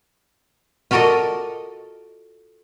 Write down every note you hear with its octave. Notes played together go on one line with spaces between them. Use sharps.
F4 F#4 A4 A#4 D5 D#5